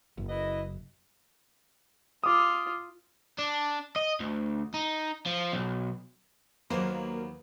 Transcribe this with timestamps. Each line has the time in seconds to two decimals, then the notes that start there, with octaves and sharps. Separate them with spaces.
0.18 F#1
0.29 E4 B4 D#5
2.24 F4 D6 D#6
3.39 D4
3.96 D#5
4.20 D2
4.74 D#4
5.26 F3
5.53 B1
6.70 D#2 F#3 A#3 B3 C5